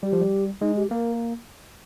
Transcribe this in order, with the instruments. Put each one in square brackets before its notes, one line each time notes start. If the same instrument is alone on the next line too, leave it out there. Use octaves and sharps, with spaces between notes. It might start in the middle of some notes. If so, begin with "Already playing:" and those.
[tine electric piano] G3 [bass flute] G4
[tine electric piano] F3
G3
[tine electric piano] G#3 [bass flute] D#4
[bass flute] G4
[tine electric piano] A#3 [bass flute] A#4